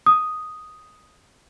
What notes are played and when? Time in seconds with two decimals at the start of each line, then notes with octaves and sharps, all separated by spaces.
0.06 D#6